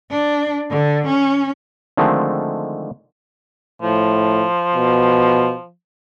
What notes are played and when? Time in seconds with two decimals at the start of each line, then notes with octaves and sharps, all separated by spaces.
0.11 D4
0.70 D3
1.07 C#4
1.97 D3 D#3 F3 G#3 A3 C4
3.82 A2 F3
4.75 B2